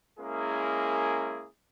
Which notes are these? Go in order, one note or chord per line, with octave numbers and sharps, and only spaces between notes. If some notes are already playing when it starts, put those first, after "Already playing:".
G#3 A#3 C#4 E4 G#4 A#4